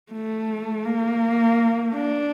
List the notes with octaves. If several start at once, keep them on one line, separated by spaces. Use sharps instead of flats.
A3
A#3
D4